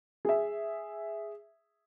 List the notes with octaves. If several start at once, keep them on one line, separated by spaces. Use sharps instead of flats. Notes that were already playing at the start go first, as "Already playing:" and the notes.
G#4 E5